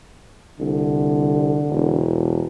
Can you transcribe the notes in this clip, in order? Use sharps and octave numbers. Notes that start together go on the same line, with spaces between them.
C2 D3
E1